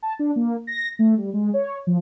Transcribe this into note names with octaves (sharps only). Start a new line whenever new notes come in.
A5
D4
A#3
A#6
A3
G3
G#3
C#5
F3